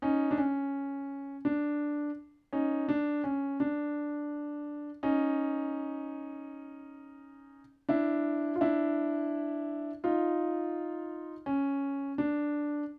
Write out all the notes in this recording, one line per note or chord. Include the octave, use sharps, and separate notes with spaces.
C#4 D#4
D4
C#4
D4
C#4 D#4
D4
C#4
D4
C#4 D#4
D4 E4
F4
D4 E4
D#4 F4
C#4
D4